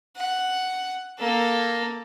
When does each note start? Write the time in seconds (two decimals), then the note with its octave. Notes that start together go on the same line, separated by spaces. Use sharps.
0.17 F#5
1.19 A#3 A4